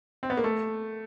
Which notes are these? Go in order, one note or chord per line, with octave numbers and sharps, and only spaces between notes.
C4
B3
A#3
A3